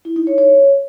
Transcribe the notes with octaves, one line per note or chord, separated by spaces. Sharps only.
E4
D#4
C#5
C#5